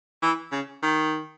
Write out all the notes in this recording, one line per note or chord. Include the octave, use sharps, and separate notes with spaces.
E3
C#3
D#3